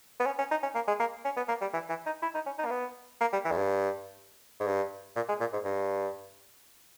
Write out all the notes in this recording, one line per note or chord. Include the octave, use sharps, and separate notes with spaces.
B3
C#4
C#4
D#4
C#4
A#3
G#3
A#3
C#4
B3
A#3
G3
E3
E3
D#4
E4
D#4
C#4
D#4
A#3
B3
A#3
G3
E3
E2
G2
G#2
G2
A#2
G#3
A#2
G#2
G2